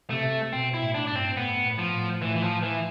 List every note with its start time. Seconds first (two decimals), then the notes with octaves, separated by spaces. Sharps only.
0.10 C3 A3
0.53 B2 C4
0.74 E4
0.80 A2
0.95 D4
1.07 G2 D4
1.15 C4
1.36 A2 B3
1.64 A2
1.79 F3
1.92 A2
2.22 A2 E3
2.36 E3
2.42 F3
2.63 E3